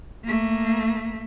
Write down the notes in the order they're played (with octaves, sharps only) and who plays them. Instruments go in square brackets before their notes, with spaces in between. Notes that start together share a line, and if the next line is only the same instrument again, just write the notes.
[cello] A3 A#3